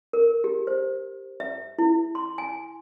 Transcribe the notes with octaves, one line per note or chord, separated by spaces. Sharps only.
A#4
G4
C5
E5
E4
C6
G#5